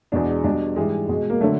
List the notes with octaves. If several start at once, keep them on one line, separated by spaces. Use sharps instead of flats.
E2 B2 G#3 D4
B2 G3 D4
G#2 E3 G3 G#3
B2 G#3
A#3
D3 F#3 A3